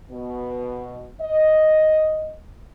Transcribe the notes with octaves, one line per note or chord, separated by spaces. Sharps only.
B2
D#5